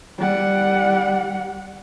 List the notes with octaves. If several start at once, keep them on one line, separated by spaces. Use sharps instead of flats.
G3 F#5